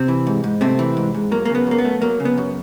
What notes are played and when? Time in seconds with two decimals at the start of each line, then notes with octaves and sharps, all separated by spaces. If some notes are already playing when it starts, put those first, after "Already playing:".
Already playing: C3 C4
0.08 E3
0.27 G#2
0.44 G#2
0.61 C3 A3 C4
0.79 E3
0.97 G#2
1.14 G#2
1.31 F#3 A#3
1.45 A#3
1.50 C#3
1.55 B3
1.67 F#2 A#3
1.78 B3
1.85 A3
2.02 F#3 A#3
2.20 C#3
2.25 B3
2.37 F#2